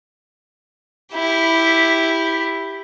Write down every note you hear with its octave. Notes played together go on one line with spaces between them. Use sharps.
E4 G4